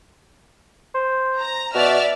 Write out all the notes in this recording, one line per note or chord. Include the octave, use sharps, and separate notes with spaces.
C5
A#5
B2 D5 E5 F6